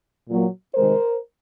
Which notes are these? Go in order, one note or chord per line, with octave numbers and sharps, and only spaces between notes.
A#2 F#3 A#3
C3 D#3 G#3 A#4 C5